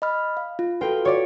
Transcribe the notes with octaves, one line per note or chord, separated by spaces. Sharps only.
D#5 B5 F6
F5
F4
F4 F#4 A4 B4 G5
F#4 C#5 D5 F5